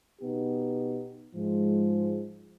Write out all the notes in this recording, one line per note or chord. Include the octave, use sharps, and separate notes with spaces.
B2 B3 D#4 G4
G#2 F3 G#3